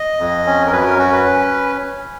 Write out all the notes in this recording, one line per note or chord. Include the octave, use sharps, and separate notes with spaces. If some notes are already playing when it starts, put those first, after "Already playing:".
Already playing: D#5
F2
C#4
A#4
F#2 B4
A#4
C#4 F#4
B4
C#4